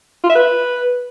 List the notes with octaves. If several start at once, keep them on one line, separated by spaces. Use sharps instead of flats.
F4
E5
B4